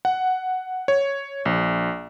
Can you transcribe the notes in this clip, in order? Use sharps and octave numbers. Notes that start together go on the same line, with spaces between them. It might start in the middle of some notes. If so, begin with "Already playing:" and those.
F#5
C#5
A#1